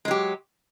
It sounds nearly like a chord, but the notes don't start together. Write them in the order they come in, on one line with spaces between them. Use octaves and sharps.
G#3 F#3 G4